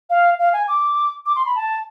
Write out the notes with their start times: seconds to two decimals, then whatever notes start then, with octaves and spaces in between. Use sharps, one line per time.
0.10 F5
0.39 F5
0.53 G#5
0.68 D6
1.26 D6
1.36 C6
1.46 B5
1.56 A5